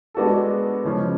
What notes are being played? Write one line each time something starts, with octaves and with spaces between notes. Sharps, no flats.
G#3 B3 D4 F#4 A4
C#3 F3 G#3 C#4